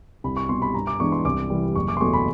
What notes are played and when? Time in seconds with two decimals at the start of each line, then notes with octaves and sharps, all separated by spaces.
0.24 C2 B5
0.37 C#6
0.49 B2 G3 C6
0.62 B5
0.74 G2 A#5
0.87 D6
1.00 E3 G#3 B3 D4 C#6
1.12 C6
1.25 C2 D6
1.50 C3 E3 G3
1.76 F#1 C#6
1.88 D6
1.97 C6
2.01 E2 B2 F#3 A3 C#6
2.13 B5